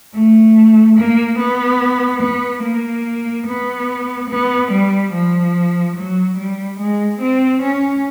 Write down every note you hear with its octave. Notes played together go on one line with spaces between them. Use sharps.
A3
A#3
B3
B3
A#3
B3
B3
G3
F3
F#3
G3
G#3
C4
C#4